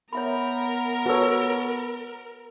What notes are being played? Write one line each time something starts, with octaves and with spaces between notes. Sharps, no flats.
B3 A#4 C#5 E5 B5
F#4 A4 B4 C#5 E6